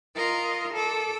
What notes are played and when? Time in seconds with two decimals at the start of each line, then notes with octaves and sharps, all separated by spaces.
0.15 F4 A#4 D#5
0.73 A4 D6 E6